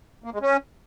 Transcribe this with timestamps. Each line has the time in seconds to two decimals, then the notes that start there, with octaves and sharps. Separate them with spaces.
0.24 A#3
0.33 G#3
0.42 C#4